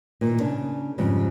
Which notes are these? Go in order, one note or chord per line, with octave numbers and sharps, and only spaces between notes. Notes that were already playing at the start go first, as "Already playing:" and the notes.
A#2 D#3
C#3 D4
F2 G#2 C#3 F3 G3